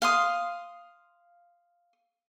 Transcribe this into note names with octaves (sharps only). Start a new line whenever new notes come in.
F5 C6 D#6